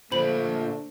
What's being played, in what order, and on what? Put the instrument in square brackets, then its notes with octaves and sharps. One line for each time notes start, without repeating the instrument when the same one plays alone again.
[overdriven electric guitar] A#2 D4 [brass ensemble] D3 A3 [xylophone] C5 B5 F#7